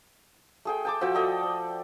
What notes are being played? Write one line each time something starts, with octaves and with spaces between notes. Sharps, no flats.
A3 G#4 G5
G5 A5 D6
F3 F#4 E5 G5
A4 D5 D#5 G5
D5